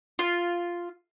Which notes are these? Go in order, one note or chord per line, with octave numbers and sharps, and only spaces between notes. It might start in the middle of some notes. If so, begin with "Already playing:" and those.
F4